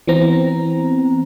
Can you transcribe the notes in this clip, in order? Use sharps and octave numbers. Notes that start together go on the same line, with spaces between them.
E3 B3 C4 A#5